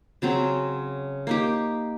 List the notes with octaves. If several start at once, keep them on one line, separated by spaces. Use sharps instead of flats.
C#3 F#3 C4 C#4
A#3 D#4 G4